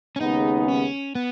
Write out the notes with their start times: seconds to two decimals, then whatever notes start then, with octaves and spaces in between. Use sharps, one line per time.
0.16 C#4
0.20 D#2 C#3 G#3 B3 D#4
0.68 C#4
1.15 B3